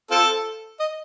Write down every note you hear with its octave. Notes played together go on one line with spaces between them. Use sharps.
C4 F4 A4
D#5